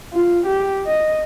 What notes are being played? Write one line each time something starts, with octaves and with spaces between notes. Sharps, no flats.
F4
G4
D#5